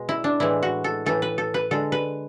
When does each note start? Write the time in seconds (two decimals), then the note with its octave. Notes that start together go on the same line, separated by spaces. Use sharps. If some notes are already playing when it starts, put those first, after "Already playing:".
Already playing: B2 G#3
0.09 E4
0.24 D4
0.40 A2 E3 G#3 E4
0.63 F#4
0.84 A4
1.06 A2 E3 A3 A4
1.22 B4
1.38 A4
1.54 B4
1.71 D3 G#3 A4
1.92 B4